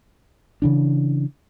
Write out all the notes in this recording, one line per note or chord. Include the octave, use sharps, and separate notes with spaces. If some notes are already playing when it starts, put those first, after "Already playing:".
C#3 E3 D4